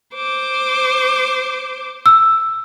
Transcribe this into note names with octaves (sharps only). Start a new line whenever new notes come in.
C5 D6
E6